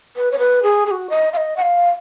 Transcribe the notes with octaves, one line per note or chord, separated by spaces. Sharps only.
B4
C#5
B4
G#4
G#4
F#4
D#5
F5
D#5
F#5
F5